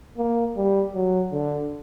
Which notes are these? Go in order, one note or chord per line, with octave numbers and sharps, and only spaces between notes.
A#3
G3
F#3
D3